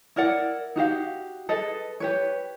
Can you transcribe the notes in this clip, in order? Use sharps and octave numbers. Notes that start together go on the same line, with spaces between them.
E4 A#4 D5 F#5
D#4 F#4 G4 F5
G#4 A4 B4 D#5
G4 B4 C#5